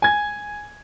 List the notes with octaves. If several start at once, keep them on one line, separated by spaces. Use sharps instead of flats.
G#5 G#6